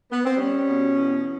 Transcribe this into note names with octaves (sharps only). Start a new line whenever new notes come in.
B3
C4
G3 C#4
B2
E2